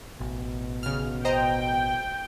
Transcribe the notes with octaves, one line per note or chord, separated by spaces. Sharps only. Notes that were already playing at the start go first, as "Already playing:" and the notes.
A1 B2
C#3 F6
C5 D#5 G5 A#5